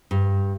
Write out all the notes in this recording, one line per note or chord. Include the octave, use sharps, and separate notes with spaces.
G2